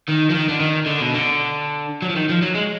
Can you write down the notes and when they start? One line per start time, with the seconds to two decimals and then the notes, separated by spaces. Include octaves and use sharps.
0.09 D#3
0.30 F3
0.35 D#3
0.49 D3
0.60 D#3
0.86 D3
1.00 B2
1.14 D3
2.02 F#3
2.09 F3
2.16 D#3
2.29 F3
2.42 F#3
2.55 G#3